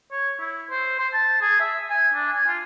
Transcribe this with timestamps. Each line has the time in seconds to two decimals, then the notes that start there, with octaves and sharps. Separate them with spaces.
0.11 C#5
0.40 E4
0.70 C5
0.99 C5
1.13 A5
1.41 G#4
1.60 E5
1.90 G#5
2.14 D4
2.33 G#5
2.47 F4